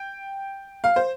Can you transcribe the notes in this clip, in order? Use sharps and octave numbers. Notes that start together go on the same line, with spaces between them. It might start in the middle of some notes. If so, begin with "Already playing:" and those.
Already playing: G5
F5
C5